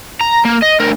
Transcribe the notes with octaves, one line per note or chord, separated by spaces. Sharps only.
A#5
A#3
D#5
D2 A#4